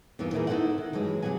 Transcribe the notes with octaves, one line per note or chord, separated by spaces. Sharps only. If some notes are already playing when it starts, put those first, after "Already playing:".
E2 G2 D#3 E3 F4
A#2 D#3 E3 E4 G#4 A#4
D#4 E4 G4 A4 C5 F#5
D#3
G2 E3 F#3 G#3
C3 F#3 D4 G#4 F#5 G#5